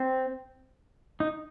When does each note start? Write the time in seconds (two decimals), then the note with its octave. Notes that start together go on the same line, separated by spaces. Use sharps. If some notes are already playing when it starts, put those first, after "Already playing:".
Already playing: C4
1.20 D#4